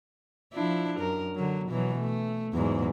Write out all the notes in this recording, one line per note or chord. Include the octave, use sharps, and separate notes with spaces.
F3 D4 E4
F#2 A#4
D3 F#3
B2 E3 F#3
A3
E2 G#2 F#3